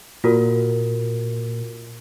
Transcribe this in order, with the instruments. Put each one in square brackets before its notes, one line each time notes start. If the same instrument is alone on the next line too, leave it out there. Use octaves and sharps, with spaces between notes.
[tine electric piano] A#2 [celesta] F4 F#4 A#4